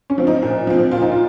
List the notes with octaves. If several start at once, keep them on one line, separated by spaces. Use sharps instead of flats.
C#4
F3 C4
D#4
A#2
F3 C4
A#2 F4
D#4
F4